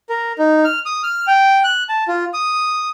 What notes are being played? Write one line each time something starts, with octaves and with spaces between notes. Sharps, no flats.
A#4
D#4
F6
D#6
F6
G5
F#6
A5
F4
D#6